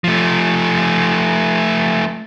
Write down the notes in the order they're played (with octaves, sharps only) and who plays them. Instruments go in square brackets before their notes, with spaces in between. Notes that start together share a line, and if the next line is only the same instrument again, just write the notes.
[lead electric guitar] F3 A3